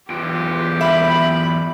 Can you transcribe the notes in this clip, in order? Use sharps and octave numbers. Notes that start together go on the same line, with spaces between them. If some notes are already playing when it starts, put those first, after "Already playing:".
E2 F4 G4 G5
E5 B5